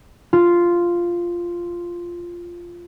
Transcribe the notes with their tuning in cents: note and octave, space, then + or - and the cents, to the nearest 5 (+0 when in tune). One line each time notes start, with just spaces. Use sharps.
F4 -5